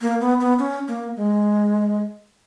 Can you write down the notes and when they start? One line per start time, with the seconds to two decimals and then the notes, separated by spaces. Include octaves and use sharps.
0.01 A#3
0.21 B3
0.40 B3
0.59 C#4
0.88 A#3
1.16 G#3